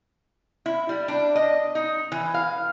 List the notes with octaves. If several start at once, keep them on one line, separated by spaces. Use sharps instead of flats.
E4
G3
D4
D#5
D#4
E3
F5